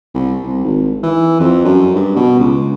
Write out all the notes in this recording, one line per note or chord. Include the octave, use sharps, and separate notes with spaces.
C2
C2
G#1
E3
F2
F#2
G2
B2
C#2